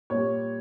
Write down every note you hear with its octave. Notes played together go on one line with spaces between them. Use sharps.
A#2 G3 C#5